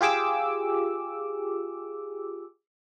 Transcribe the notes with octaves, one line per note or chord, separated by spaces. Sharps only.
F4 G4 G#4 D6 E6